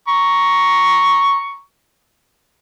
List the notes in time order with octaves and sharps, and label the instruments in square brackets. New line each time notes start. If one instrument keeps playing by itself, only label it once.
[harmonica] A#5 C#6